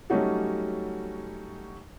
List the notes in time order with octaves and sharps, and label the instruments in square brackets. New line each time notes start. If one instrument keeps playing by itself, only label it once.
[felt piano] F#3 G3 A3 C#4 D#4 F#4